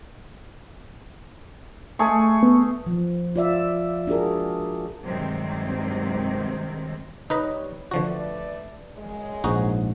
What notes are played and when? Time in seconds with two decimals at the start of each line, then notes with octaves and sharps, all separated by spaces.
1.99 A3 G#4 C#6
2.43 B3
2.87 F3
3.36 F4 D5 E5
4.07 D4 F#4 G#4 A#4
5.05 G2 C3 D#3 F#3 G#3 C4
7.30 G3 D#4 B4 C#5 D#5
7.91 D3 F3 A3 F#4 B4 D5
8.96 F#2 C#3 G#3
9.44 A#1 G#2 D#4 F#4